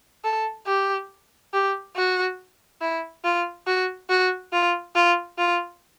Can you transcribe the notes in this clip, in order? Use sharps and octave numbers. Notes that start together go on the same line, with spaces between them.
A4
G4
G4
F#4
E4
F4
F#4
F#4
F4
F4
F4